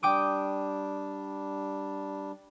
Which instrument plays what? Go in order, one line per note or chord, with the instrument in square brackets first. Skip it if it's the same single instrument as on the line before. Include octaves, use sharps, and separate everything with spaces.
[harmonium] G3 D4 [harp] G5 D6 D#6